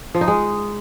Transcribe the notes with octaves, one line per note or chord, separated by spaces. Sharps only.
F3
D#4
G#3